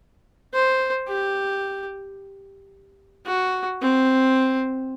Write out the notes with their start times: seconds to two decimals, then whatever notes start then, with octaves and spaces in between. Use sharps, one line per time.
0.54 C5
1.08 G4
3.27 F#4
3.82 C4